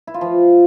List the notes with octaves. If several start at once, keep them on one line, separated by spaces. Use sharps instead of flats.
E4
F4
F3